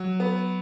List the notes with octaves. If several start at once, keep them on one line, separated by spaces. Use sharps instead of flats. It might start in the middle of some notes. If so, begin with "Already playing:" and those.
Already playing: F#3
B3